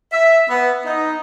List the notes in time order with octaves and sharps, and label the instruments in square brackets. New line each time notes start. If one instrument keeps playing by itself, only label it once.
[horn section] E5
B3
D#4